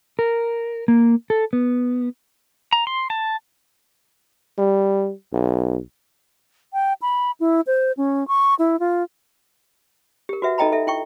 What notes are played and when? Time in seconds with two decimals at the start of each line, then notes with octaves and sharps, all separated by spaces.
0.19 A#4
0.88 A#3
1.30 A4
1.53 B3
2.73 A#5
2.87 C6
3.10 A5
4.58 G3
5.33 B1
6.73 G5
7.02 B5
7.40 E4
7.67 C5
7.97 C#4
8.28 C#6
8.59 E4
8.80 F4
10.29 G4 A#4
10.42 F#4 B4 E5 F#5
10.58 D#4 A4 D#5 G5 A#5 B5
10.72 A4 E5
10.87 E4 G5 C#6